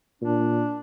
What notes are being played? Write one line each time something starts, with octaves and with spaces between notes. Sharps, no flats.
A#2 D4